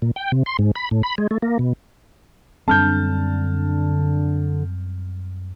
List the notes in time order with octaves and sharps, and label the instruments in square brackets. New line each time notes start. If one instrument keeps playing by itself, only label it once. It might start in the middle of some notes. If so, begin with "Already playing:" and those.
[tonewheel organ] A#2
G5
C3
C6
G#2
B5
A2
B5
G#3
A3
A#3
B2
[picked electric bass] F#2 G3 C4 [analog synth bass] D3 [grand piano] A5 F6 G6